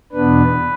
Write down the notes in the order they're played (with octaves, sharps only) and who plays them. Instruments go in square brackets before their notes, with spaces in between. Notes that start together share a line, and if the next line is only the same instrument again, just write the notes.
[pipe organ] E2 B2 B3 D4 B4